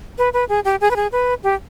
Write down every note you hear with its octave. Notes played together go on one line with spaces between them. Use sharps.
B4
B4
G#4
G4
G#4
B4
G#4
B4
G4